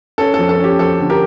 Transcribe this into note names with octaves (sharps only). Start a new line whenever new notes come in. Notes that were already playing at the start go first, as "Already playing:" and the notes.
C#4 A4
A4
F2
A4
C#4 G4
F2 A4
D3
G4 A#4